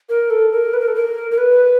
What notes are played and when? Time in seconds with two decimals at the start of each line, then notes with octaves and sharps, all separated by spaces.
0.09 A#4
0.30 A4
0.52 A#4
0.73 B4
0.80 A#4
0.88 A4
0.95 A#4
1.31 A#4
1.38 B4